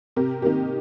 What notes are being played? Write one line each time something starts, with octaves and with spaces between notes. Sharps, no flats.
C3 G4 A#4
D#3 A#3 D#4 G4